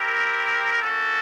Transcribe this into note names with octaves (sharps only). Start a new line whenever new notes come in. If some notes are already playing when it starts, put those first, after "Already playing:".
Already playing: C4 E4 G4 A#4
A#3 C#4 F#4 A4